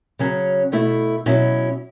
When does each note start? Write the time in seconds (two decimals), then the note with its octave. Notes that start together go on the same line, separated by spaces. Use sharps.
0.19 C#3 F#3 C#4
0.72 B2 A3 E4
1.26 B2 F#3 C#4 E4